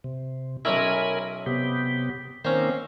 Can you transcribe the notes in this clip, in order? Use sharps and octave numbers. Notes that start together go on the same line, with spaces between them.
C3
B1 C#4 E4 A#4 G#5 B5
C3 B3 G4
D#3 A#3 C4 C#4 C5